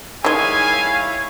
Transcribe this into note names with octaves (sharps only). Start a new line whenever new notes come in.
D#3 G3 G#3 E4 C#5 F5 G#5